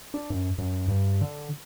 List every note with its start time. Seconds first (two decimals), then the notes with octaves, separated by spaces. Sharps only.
0.14 D4
0.30 F#2
0.58 F#2
0.88 G2
1.21 D3